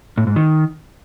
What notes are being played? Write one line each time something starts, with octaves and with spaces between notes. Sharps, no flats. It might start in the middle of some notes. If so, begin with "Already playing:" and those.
A2
G#2
D#3